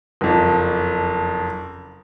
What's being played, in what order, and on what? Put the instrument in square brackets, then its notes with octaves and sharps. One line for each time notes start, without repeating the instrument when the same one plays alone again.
[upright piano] F#1 F2